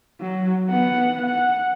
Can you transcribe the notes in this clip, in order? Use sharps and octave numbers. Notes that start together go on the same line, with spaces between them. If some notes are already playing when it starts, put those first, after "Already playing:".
F#3
B3 F#5
F#5